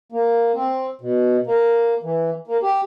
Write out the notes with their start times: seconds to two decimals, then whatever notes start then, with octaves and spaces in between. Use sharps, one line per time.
0.12 A#3
0.55 C4
1.01 B2
1.47 A#3
2.03 E3
2.47 A#3
2.63 G4